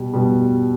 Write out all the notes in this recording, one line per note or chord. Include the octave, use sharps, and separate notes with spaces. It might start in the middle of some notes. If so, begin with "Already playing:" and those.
Already playing: B2 G3
B2 G3